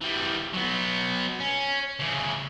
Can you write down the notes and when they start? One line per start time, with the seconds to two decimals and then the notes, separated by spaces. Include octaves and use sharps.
0.01 E3 G3
0.54 F#3 B3
1.40 C#4
1.99 C#3 E3